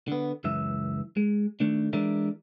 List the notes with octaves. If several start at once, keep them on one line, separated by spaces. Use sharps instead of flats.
D3 B3
C#2 F#2 E3 E5
G#3
D#3 A3 D4
E3 G#3 D4 A#4 D5 E5